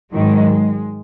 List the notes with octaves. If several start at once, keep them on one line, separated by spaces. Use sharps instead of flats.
G#2 D#3 F#3 G#3